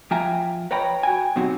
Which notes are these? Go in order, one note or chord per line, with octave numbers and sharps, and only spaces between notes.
F3 F4 E5 G5 G#5 A#5
B4 C#5 D#5 G5 A#5 B5
F#4 G5 G#5
B2 F#3 C4 D#4 F#4 G4